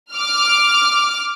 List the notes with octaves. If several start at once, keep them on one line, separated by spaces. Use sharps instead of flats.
D6 F6